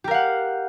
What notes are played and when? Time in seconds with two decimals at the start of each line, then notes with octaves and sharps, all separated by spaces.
0.04 G4
0.08 A#4
0.11 F5
0.14 F#5